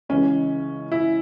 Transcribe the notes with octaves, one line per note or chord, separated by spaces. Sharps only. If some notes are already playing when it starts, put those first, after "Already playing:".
C#2 C#3 E3 C#4
E4